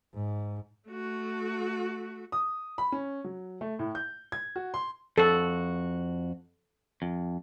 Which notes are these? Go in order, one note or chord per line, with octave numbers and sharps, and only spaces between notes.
G#2
A3 F#4
D#6
B5
C#4
F#3
A3
A2
G6
G#6
F#4
C6
F2 F#4 A4
F2